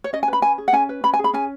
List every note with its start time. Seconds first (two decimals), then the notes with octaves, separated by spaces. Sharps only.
0.04 C#5
0.13 C#4 D#5
0.23 G#5
0.28 B4 B5
0.42 C#4 G#5
0.58 G#4
0.68 F#5
0.73 C#4 G#5
0.89 B4
1.04 C#4 B5
1.13 G#5
1.19 G#4
1.24 B5
1.33 C#4 G#5